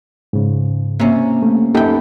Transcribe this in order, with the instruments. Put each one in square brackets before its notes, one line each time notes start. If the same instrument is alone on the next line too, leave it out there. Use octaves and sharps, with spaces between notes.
[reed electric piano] G#2 C#3
[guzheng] C3 C#4 [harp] A#3
[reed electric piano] A3
[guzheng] F#2 G5 [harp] B3 [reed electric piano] D#4 G4 A4